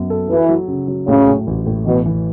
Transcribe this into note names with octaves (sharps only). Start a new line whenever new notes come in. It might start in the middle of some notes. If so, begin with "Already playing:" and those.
Already playing: F#2 B3
A4
E3 F#3
F#3
C#3
F#3
A2 C#3
A2
A1
A2
B2 E3
E3